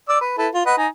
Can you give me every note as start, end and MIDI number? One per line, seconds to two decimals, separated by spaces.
0.09 0.18 74
0.09 0.18 86
0.09 0.18 88
0.21 0.35 71
0.38 0.48 64
0.38 0.48 69
0.38 0.48 71
0.54 0.62 65
0.66 0.75 71
0.66 0.75 75
0.66 0.75 78
0.78 0.87 63
0.78 0.87 80